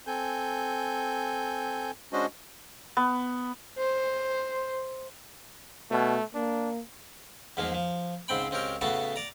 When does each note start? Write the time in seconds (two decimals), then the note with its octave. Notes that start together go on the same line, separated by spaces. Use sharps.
0.07 C4 A4 G#5 G6
2.13 G#3 C#4 D4 F#4 C5 D#5
2.97 B3
3.79 C5
5.91 B2 A3
6.35 A#3 D4
7.57 E2 G#2 F3 A#3
7.74 F3
8.28 C#2 G#2 C4 G5 B5
8.51 C#2 C4 C#4 G4 A#4
8.81 A2 C#3 A3 B3 F#4 A5
9.16 D5 A#5